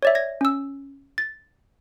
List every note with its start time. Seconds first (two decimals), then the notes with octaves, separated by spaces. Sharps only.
0.03 C#5 D5 E5
0.15 G#6 A#6
0.41 C#4 E6
1.18 A6